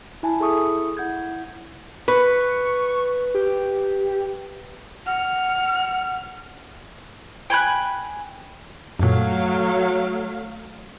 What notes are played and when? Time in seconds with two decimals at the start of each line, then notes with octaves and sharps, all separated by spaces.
0.23 E4 G#5 A5
0.40 E4 G#4 A4 E5 C#6 D#6
0.97 E4 F#5 G6 G#6
2.08 B4 C#6
3.35 G4
5.06 F#5 F6
7.50 G5 G#5 B5 F#6
8.99 F#2 A#2 F#3 A3 F5